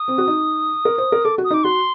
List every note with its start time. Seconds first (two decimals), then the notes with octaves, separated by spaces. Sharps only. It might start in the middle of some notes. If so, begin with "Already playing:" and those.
Already playing: D#6
0.08 C4
0.18 F#4
0.28 D#4
0.85 A#4
0.98 C5
1.12 A#4
1.25 A4 D6
1.38 F#4
1.44 D#6
1.51 D#4 D6
1.64 F#4 C6